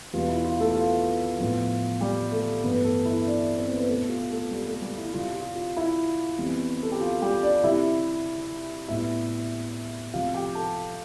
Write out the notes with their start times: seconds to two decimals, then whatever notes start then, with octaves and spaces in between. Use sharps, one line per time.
0.13 E2 B2 G3 B3 F4
0.29 E4
0.45 F4
0.60 A3 A4
0.76 F4
1.39 A2 F3 B3
2.01 G3 G4
2.32 A3 A4
2.64 G2 E3 A3 B3 B4
2.84 A3 A4
3.05 E4
3.21 E5
3.26 D4 D5
3.57 C4 C5
3.73 B3 B4
3.88 B2 A3 A4
4.09 F4
4.30 A3 A4
4.51 G3 G4
4.66 A3 A4
4.82 G3 G4
4.97 E4
5.14 F2 C3 G3 F4
5.35 F4
5.55 F4
5.77 E4
6.38 F2 E3 G3 B3
6.83 A4
6.92 G4
7.01 F4
7.22 G3 G4
7.43 D4 D5
7.63 F2 C3 G3 E4 E5
8.88 A2 G3 B3 E4 E5
10.14 C3 F3 A3 F4 F5
10.34 G4 G5
10.55 A4 A5